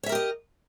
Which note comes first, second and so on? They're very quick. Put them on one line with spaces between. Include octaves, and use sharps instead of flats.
C#5 E5 A#4 G4 D#5